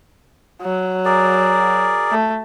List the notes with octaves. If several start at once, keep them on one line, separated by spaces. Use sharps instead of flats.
F#3
G#4 A#4 D5
A3